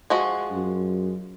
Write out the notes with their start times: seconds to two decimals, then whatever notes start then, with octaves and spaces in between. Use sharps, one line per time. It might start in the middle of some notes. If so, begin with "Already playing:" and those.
0.10 F3 G#3 F#4
0.51 F#2